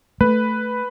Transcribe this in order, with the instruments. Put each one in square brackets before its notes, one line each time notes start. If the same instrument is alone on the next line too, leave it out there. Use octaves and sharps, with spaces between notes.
[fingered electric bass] A3 [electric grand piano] B4